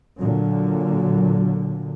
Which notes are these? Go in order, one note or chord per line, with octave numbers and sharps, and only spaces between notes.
A#2 D3 F#3